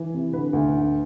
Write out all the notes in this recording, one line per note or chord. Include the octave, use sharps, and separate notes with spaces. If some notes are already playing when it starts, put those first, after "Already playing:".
Already playing: E3
C3
D3 B4
D2
D3